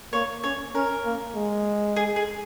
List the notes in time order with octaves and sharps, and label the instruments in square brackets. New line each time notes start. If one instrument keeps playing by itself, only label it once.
[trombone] A#3 [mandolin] C#5
[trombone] C#4 [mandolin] C#5
[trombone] C#4 [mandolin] A#4
[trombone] A#3
G#3
[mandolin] G#4
G#4